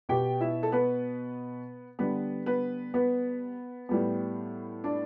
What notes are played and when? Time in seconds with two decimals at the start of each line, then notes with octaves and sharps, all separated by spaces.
0.09 B2 B3 G4 G5
0.41 E4 E5
0.63 A4
0.72 B3 B4
1.99 D3 G3 B3 B4
2.46 B3 B4
2.94 B3 B4
3.89 A2 G3 B3
4.84 D4 D5